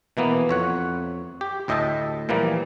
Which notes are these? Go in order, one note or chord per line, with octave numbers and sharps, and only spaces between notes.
B2 E3 A#3 B3
F2 C#5 F#5
G4
D2 A2 D#5 E5 G5 A5
A#2 E3 F3 G3 A#3